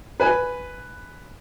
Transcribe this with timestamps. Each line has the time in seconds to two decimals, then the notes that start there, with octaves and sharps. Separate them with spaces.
0.20 B4 G#5